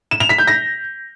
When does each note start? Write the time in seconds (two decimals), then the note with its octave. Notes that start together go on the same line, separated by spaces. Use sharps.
0.11 E7
0.20 F7
0.29 B6
0.38 G6
0.47 A#6